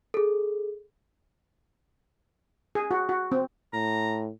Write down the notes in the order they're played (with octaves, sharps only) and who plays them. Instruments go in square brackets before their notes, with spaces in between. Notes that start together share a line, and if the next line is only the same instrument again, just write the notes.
[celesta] G#4 A4
[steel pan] G#4
F#4
F#4
C4
[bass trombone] A2 [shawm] A#5